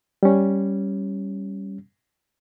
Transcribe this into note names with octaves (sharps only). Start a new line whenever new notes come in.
G3 C#4